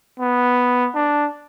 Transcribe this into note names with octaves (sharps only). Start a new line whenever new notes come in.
B3
D4